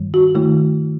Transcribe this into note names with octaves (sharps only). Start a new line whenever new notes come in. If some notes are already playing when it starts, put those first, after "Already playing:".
Already playing: G2 D#3 G3
F#4
D#3 A3 E4